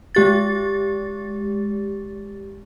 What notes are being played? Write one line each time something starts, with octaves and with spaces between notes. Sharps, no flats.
G#3 G4 A6